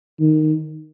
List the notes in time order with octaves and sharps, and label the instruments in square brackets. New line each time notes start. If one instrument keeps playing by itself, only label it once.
[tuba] D#3